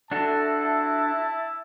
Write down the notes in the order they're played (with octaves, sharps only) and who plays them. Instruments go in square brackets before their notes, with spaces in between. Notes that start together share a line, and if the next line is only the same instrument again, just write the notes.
[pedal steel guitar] D4 F#4 A4 [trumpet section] E4 E5 A5